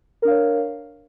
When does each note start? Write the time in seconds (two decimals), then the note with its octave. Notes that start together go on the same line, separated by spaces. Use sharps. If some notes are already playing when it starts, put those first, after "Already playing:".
0.22 A#4
0.25 D4
0.28 F5
0.30 C#5